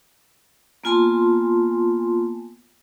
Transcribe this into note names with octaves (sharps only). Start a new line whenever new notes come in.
A#3 B3 F4 G#5 A5 C6